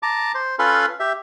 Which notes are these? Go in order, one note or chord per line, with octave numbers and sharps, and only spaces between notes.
A5 A#5 D6
C5
C#4 F4 A4 B4 B5 C6
G4 E5